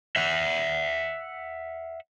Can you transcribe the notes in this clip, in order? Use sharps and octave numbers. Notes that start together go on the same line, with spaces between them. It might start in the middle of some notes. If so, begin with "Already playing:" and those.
E5 F#5